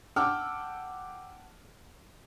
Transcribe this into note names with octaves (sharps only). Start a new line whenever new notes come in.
F#5 G5 A5 D6 E6 F6